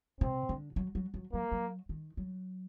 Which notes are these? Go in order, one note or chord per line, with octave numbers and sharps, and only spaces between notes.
C3 C4
D3
F#3
F#3
F#3
F#3 A#3
F#3
D#3
F#3